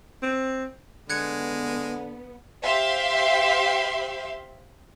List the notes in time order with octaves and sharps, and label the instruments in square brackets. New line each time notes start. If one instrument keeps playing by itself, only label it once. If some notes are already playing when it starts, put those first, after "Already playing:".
[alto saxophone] C4
[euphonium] D3 [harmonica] G#3 [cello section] B3 [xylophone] F#6 G#6 C#7
[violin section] G4 C5 E5 F5 C6